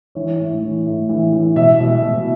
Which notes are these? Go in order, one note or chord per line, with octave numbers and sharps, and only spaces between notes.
E3 C#5
A2
E3
A2
E3
E3
B2 E5
B2
B2